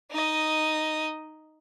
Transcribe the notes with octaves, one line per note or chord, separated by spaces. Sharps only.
D#4 D#5